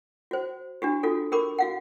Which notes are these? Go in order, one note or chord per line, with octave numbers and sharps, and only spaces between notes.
F#4 C5
D4 F#4 G4
F4 F#4 A4
G4 A#4 B5 D6
F#4 F5 F#5